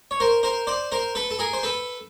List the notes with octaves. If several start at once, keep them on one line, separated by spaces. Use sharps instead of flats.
C#5
A#4 C5
A#4 C5
C5 D5
A#4 C5
A4 B4
A4
G#4 A#4
C5
A4 B4